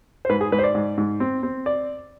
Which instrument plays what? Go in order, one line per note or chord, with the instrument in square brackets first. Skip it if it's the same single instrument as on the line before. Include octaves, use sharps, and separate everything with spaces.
[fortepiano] C5
G#2 B4
G#4
G#2 B4
C5
D5
G#2
G#2
C4
C4
D5